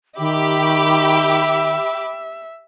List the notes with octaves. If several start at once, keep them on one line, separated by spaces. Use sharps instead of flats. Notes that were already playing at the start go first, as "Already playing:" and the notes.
D#3 G4 E5 B5 D6